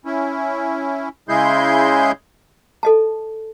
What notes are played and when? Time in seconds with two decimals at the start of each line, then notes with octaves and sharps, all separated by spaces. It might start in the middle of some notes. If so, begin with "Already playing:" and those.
0.05 C#4 E4
1.29 C#3 G#3 E4 G#4 C6 G6
2.83 A4 D#5 A5